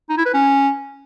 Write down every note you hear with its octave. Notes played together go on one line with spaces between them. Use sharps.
D#4
E4
B4
C#4